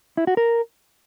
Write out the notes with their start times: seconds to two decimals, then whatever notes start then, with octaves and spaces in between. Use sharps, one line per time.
0.17 E4
0.27 F#4
0.37 A#4